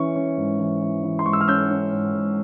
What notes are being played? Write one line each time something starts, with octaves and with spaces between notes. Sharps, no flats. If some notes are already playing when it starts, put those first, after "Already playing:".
Already playing: E3 C#4 C#6
C#4
G#2
E3
E3
E3
C6
G#2 C#6
E6
F6
C#4 E6 G6
C#4
G#2
G#2